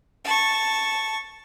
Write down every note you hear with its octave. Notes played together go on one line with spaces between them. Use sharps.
A5 C#6